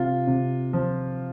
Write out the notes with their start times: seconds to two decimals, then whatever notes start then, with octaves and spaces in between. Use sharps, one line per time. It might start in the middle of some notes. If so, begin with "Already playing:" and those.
Already playing: C3 F4
0.27 C3
0.73 F3